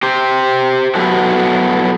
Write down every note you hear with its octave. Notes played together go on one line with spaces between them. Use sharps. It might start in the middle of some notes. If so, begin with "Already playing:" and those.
G4 C5
F#3 A3 B3 E4 F#4 A4